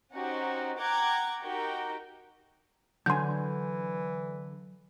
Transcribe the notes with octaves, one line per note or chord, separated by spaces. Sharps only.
C#4 D#4 F#4 G4 C5
F#5 G5 A#5 D6 F#6 G#6
D#4 F#4 G4 A#4 G5
D3 E3 F#3 G#5 C6 G6